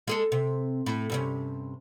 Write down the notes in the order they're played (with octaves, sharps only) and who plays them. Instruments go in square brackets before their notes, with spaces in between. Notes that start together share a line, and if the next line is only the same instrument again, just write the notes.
[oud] G#3 G#4 A4
C3
A2
G2 C3 C#4